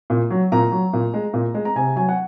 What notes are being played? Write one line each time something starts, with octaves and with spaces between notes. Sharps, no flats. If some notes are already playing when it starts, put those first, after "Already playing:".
A#2
F#3
A#2 A#5
F#3
A#2
G#3
A#2
G#3
A#5
C3 G#5
F#3 G#5
F#5